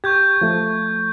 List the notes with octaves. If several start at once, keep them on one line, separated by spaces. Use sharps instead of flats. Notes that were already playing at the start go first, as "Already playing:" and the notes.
G4 C#6 G6 G#6
F3 A3